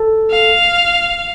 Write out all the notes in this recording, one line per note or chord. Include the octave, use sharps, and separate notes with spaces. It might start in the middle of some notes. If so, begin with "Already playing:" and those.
Already playing: A4
F5